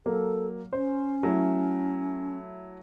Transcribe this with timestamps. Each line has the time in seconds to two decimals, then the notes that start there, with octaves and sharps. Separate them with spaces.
0.06 F#3 A#3 A4
0.73 C#4 C5
1.23 F#3 A3 E4